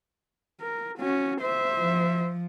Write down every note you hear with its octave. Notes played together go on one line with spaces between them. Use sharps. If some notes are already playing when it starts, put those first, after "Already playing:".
A#4
C#4 F#4
C5 E5
F3